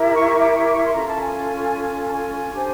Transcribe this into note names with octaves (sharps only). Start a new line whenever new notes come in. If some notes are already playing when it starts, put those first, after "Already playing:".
Already playing: E4 G4 A#4
C#6
C#6
D6
C#6
D6
C#6
C6
C#4 F4 A4 A#5
A5
G#5
A5
G#5
D4 G4 C5